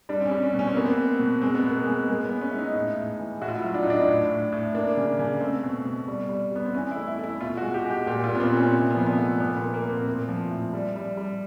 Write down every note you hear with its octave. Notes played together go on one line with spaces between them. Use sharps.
G3 D4
C4
C#4
G3
C#4
B2
C#4
C4
A#3 B3
C4
A#3
B2
G#3 C4
B3
B2 A#3
B3
G#3
G#3 A#3
B3
G#3
C#4
G#3 E4
D#4
A2
A2
E3
A2 F#4
F4
E4
F#3 F4
D4
D#4
A2 D4
A2
A2
A2
A#3 D4
C#3
C#3
A3 C4
B2
B2
G3
G3
G3 B3
C4
E3 C#4
E4
A3
E4
A3 E4
B2 F4
F#4
G#3
G4
G#3
G4
A#2 G4
F4
A#2
B3
C4
A#2
C#4
C3 C4
B3
F3
B3
A3
A#2 B3
B3
A#3
A#3
A#2
C4
A2
F3
A2
G3
G3
G3